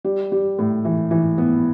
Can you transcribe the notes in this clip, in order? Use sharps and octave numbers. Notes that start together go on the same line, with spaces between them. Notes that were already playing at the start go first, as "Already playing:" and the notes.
G3
G3
A2
E3
E3
B3